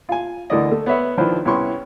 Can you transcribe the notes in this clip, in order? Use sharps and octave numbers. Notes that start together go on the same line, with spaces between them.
F4 G#5
D2 D3 E3 A#4 D5 D#5
A3
B3 C#5 E5 F#5
D#3 F3 D4 E4 B4 C5
C2 B3 C#4 E4 C6 C#6